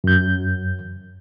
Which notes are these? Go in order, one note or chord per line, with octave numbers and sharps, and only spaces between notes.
F#2 G6